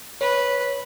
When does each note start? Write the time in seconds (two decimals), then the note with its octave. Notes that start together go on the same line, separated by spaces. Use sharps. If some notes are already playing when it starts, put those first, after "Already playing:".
0.21 B4 C#5